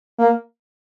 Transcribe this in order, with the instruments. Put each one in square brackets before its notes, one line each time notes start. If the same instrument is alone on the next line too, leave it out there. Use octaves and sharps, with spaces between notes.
[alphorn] A#3